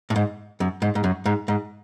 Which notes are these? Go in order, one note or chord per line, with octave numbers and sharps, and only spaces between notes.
A2
G#2
F#2
G#2
G#2
F#2
G#2
G#2